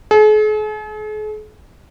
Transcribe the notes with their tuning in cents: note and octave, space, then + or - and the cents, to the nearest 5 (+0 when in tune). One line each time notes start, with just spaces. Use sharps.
G#4 +45